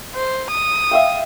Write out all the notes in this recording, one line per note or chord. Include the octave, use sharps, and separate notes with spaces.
C5
D#6
E5 F5 G5